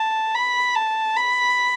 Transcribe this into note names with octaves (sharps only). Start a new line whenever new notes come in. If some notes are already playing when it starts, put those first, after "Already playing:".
Already playing: A5
B5
A5
B5